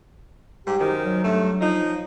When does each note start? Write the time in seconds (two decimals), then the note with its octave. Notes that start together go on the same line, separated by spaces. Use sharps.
0.67 G#2 G3 G4
0.79 F#2 D#3 C5
1.03 F#3
1.24 G2 A3
1.61 F3 D#4